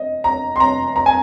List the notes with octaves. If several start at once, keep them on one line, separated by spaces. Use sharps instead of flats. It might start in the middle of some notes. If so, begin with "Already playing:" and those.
Already playing: D#5
A#5
C6
A#5
A#5
G#5